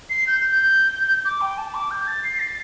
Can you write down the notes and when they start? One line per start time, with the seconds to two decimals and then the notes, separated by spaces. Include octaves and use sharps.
0.10 C7
0.27 G6
0.52 G6
1.25 D6
1.41 G5
1.58 A5
1.74 D6
1.91 G6
2.07 A6
2.24 C7
2.39 A6